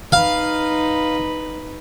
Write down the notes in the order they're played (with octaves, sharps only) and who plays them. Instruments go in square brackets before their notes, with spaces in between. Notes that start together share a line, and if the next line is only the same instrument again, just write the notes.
[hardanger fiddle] D#4 B4 [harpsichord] F5